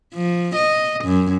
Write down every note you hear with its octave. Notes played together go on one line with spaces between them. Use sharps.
F3
D#5
F#2